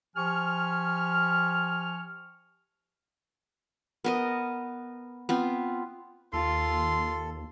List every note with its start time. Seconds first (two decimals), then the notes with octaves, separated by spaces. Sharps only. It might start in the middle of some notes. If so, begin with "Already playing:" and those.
0.16 F3 G4 G#5 C#6 F6
4.04 B3 A#4 D#5
5.29 B3 C4 F4
6.33 D#2 F4 A4 C6